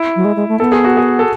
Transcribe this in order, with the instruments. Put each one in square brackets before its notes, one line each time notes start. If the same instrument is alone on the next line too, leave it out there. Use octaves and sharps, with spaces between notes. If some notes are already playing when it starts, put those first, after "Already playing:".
Already playing: [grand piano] E4
[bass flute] F#3
G#3
G#3
A3
[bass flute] B3 [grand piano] A4
[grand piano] G#4
F#4
G#4
A4